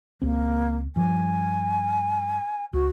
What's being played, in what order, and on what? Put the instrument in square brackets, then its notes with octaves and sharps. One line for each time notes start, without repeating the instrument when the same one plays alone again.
[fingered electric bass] C#2 C4 [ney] A#3
[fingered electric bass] G2 F3 [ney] G#5
[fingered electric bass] C#2 [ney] F#4